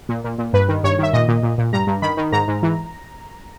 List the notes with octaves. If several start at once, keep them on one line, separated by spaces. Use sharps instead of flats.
A#2
A#2
A#2
G2 B4
D#3
G2 C#5
D#3 E5
A#2 D#5
A#2
A#2
A#2
G2 A#5
G2
D#3 B5
D#3
G#2 A#5
G#2
E3